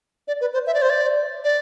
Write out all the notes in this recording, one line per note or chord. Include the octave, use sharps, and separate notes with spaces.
D5
B4
C5
E5
D5
C5
D5
D5